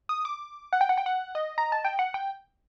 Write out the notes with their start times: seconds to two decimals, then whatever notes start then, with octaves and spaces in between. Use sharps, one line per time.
0.09 D#6
0.25 D6
0.73 F#5
0.81 G5
0.89 F#5
0.98 G5
1.06 F#5
1.35 D#5
1.58 A#5
1.72 A5
1.85 G5
1.99 F#5
2.14 G5